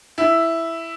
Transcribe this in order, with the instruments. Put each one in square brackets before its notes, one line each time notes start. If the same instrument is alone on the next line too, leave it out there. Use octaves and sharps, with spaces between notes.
[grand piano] E4